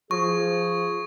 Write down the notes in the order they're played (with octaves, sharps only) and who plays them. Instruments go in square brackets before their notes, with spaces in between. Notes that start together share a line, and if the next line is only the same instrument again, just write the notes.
[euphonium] F3 [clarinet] G#4 [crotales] C#6